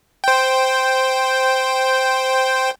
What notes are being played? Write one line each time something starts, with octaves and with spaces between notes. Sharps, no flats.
C5 G5